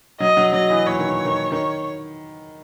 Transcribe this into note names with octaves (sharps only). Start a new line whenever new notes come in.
F#3 D#5
F#3
F#3 D#5
E3
E3 C#5
D#3
D#3
D#3 C#5